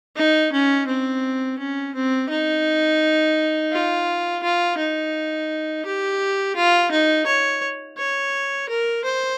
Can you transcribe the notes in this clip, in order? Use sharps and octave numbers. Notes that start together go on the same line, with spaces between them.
D#4
C#4
C4
C#4
C4
D#4
F4
F4
D#4
G4
F4
D#4
C#5
C#5
A#4
C5